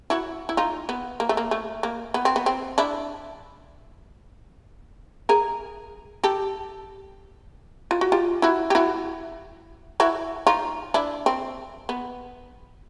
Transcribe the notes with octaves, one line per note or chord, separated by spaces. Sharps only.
E4 F#4
E4
D#4 F4
B3
A#3
A3
A#3
A3
A#3
B3
C4
B3
C4
D4 E4
G#4 A#4
G4 A4
F4
F#4
F4 G4
E4 F#4
G4
E4 F#4
E4 F#4
D#4 F4
D4 E4
C4
B3